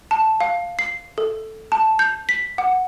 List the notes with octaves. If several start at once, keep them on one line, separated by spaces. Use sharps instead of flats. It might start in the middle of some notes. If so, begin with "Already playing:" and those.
A5
F5
C7
A4
A5
G6
B6
F#5